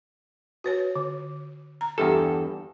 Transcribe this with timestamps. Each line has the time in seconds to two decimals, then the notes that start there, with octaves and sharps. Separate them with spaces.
0.64 F#4 B4 C#5
0.96 D3
1.81 A#5
1.98 E2 G2 G4 A4